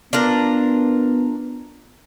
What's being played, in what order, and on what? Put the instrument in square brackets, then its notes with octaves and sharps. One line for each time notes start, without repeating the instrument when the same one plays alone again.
[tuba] B3 [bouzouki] D4 F4 A#4